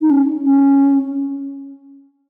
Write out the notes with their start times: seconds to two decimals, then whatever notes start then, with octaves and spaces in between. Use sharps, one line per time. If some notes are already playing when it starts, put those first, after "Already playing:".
0.02 D#4
0.11 C#4
0.45 C#4